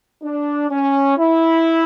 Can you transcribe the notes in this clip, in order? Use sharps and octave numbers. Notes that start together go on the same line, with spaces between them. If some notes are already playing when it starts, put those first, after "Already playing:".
D4
C#4
E4